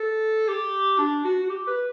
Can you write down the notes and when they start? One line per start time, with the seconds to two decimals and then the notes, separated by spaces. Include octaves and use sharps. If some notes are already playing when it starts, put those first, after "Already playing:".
Already playing: A4
0.48 G4
0.99 D4
1.24 F#4
1.43 F#4
1.50 G4
1.67 B4